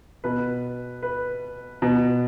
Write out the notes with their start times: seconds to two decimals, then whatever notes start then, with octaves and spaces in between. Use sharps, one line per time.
0.24 B2 B4
1.02 B4
1.82 B2